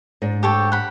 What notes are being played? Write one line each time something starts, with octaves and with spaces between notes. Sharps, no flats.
G#2 D4
G4 A4 C#5
F#5 B5